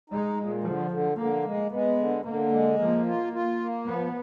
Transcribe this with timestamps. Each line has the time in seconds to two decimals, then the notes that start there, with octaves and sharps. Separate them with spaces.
0.10 G#3 D#4
0.37 A#2
0.63 D3 F3
0.91 D3
1.17 D3 A#3
1.45 G#3
1.71 G#3 B3
1.98 D3
2.25 D3 A#3
2.52 G#3
2.79 F3 A#3
3.06 F4
3.33 F4
3.60 A#3
3.87 F3 B3